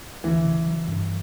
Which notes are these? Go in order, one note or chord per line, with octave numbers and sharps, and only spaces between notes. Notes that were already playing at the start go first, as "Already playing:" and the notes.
D2 E3
C#3
F#3
G2